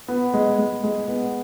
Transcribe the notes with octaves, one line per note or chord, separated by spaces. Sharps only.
B3
G#3
G#3
G#3
B3